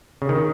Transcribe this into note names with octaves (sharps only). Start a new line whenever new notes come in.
C#3
D#3